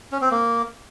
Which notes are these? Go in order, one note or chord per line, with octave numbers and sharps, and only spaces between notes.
C#4
C4
A#3